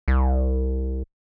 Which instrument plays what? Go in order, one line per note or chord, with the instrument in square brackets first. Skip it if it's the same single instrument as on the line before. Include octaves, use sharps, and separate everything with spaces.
[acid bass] C2